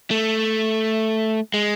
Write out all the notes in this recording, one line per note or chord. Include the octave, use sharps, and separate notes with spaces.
A3
G#3